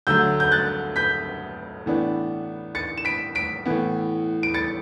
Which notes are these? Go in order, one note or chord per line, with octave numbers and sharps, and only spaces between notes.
D2 D3 F#3 E6 G6
G6
F#6 A6
G6 B6
A2 E3 B3 D4
A6 C#7
E7
B6 D7
B6 D7
A2 E3 B3
D7
A6 C#7